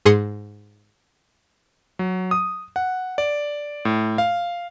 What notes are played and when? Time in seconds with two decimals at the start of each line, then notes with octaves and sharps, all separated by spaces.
0.05 G#2 G#4 C6 D#6 C#7
1.99 F#3
2.31 D#6
2.76 F#5
3.18 D5
3.85 A2
4.18 F5